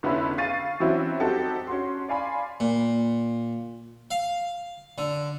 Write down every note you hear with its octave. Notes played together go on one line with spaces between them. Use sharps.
F1 D3 B3 C#4 E4 E5
F5 C#6 A6 D#7
E3 F#3 C4 C#4 E4 F#4
G3 C4 D#4 F#4 G4 A4
C#4 F#4 C6
D5 F5 G#5 B5 C6
A#2
F5
D3